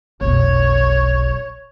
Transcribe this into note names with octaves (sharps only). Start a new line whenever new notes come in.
F1 B1 C#5